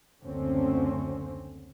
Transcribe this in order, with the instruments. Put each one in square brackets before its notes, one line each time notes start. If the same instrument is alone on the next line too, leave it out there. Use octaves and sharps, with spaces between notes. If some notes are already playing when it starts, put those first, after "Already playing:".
[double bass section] F#1 D2 D3 C4 C#4